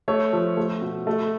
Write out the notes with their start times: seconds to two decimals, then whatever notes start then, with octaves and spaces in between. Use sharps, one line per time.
0.08 A3 C#5
0.33 F3
0.57 A3
0.81 B2
1.07 A3